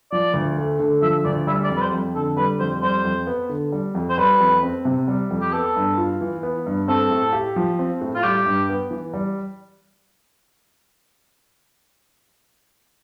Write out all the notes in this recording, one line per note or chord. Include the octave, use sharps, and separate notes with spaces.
F3 D5
D2
A3
D3
F3 E5
D2 D5
G3 E5
D5
F2
B4
C5
F2
D3 A4
G3 B4
F2 C5
G3 C5
F2
B3
D3
G3
F2
C5
G3 B4
F2
C4
C3
G3
F2
G4
B3 A4
G2
F4
E3
B3
G2
C4 A4
A2
G4
F3
C4
A2
F4
G3 G4
G2
B3
E3
G3